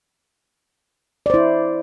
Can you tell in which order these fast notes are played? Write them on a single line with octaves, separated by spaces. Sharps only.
D5 C5 E4